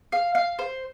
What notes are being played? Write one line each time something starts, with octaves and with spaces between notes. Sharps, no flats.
F5
F5
C5